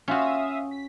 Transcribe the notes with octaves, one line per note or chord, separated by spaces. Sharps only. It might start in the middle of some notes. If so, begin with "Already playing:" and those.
C#4 F4 F#4 E5 F5 D#6
B6